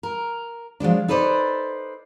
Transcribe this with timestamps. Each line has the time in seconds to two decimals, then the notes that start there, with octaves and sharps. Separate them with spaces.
0.03 A#4
0.80 F3 F#3 G#3 D4
1.08 D#4 A4 B4 C5 D5